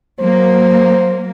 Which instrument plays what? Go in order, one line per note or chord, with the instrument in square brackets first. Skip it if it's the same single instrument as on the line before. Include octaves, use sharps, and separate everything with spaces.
[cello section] F#3 A#3 [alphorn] C5